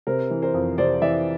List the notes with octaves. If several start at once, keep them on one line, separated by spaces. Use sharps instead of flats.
C3 A#4 C5
E3
A#4 C5
F2
C3 C5 D5
E3 D5 E5